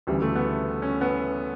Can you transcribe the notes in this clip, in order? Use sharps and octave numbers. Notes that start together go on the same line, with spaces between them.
D2 C#3 E3 G3
A3
B3
C#4
B3